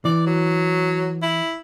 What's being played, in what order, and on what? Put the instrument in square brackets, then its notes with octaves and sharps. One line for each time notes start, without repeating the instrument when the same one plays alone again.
[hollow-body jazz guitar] E3 [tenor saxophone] D5
[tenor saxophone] F#3
E4